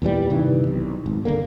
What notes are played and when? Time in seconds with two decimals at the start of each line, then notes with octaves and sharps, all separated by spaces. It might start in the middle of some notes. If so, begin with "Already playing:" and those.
0.02 E2 A#2 E3 G3
0.30 G2 C3 D#3 E3
0.67 B1
1.06 G#1
1.25 G1 D3 A#3